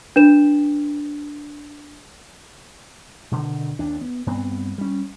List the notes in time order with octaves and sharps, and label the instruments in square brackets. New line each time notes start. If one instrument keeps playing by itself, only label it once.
[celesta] D4 B4 E7
[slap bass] B2 D3 D#3
D#2 D4
B3
G2 B3 C4
G3 C#4